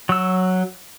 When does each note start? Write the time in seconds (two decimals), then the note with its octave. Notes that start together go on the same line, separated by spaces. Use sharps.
0.09 F#3 E6